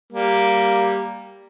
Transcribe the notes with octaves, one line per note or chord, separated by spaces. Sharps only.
G3 A#3